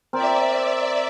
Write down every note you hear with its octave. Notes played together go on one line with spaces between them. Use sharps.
C4 A#4 D5 E5